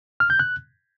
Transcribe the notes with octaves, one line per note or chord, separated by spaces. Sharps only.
F6
G6
F#6